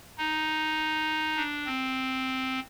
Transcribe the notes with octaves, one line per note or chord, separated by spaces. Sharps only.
D#4
D4
C4